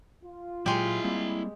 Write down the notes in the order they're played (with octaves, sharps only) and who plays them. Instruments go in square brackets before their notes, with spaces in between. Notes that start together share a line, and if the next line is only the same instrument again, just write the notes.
[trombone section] F4
[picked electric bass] A#2 F#3 [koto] G#3 G4 [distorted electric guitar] E4 C6
[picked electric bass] G3 A#3 C4